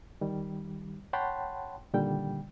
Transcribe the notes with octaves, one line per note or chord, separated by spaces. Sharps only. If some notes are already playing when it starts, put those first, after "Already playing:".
D#3 G3
C#5 F#5 G5 A5 B5 C6
A#2 D3 D#3 G3 G5